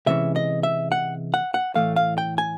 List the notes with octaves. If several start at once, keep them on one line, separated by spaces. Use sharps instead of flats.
C3 E3 G#3 C#4 E5
D#5
E5
F#5
F#5
F#5
A2 E3 A3 F5
F5
G5
G#5